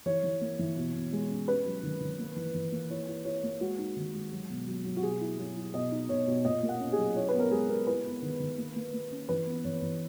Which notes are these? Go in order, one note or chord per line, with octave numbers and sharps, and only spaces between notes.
E3 C#5
E3
A#3
E3
B2
B2
G#3
C#4
C#4 B4
F#3
D#3
D#3
A#3
E3
E3
A#3
E4 C#5
E4
E4 C#5
A#3
G#3 F#4
D#4
D#3
G#3
F#3
B2
F#3
F#3
F#4
B2 G#4
E4
F#3
E4
B2 D#5
D#4
B2 C#5
B2
A#2 D#5
A#3
F#5
C#4
G#4
F#3
E4 C#5
B4
B3
A#4
G#3 G#4
B3 A#4
E4 B4
B3
D#3
D#3
A#3
A#3
A#3
C#4
E3 B4
B3
E3 C#5
E3